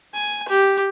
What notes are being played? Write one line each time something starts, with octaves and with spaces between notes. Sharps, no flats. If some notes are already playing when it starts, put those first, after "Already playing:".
G#5
G4